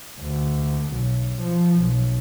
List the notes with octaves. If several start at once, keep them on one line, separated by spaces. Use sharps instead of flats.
D2
B1
F3
B1